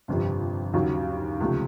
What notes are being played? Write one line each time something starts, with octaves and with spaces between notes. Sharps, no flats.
G1 F2 C3
D#2 C#3 F#3
C#2 C3 F3 A3